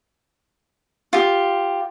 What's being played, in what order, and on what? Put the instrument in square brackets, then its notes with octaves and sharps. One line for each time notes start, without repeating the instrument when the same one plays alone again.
[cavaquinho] F4 G4